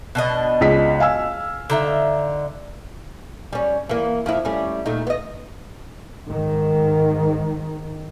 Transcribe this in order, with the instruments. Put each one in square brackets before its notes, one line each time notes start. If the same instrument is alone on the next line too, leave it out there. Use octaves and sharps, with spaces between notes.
[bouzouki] B2 D4 D#5
[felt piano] C#2 B6
F5 G#5 E6
[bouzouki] D3 D#4 E5
[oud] G3 C#4
E3 A#3
F2 F3 E4
G3 A3 C#4
A#2 A3 D#4
B3 D#5
[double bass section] G#2 D#3